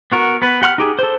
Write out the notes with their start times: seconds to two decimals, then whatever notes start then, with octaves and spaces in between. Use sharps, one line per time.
0.12 B3 F#4 A#4
0.42 B3 B4
0.62 G4 F#5 C6 F6
0.78 D#4 G4 G#4
0.99 A4 C5